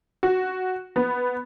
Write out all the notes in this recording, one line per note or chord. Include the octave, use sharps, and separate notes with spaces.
F#4
B3